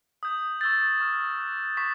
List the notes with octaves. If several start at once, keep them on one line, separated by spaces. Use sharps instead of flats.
D#6 G6
C#6 E6 G6 A6
C#6 F6
D6 F#6
C#6 B6